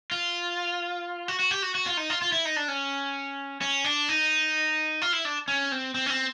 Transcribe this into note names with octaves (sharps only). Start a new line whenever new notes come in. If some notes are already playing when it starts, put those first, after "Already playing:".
F4
F#4
F#4
G4
F#4
F#4
F4
D#4
F4
F4
E4
D#4
D4
C#4
C#4
D4
D#4
F4
E4
D4
C#4
C4
C4
C#4
C4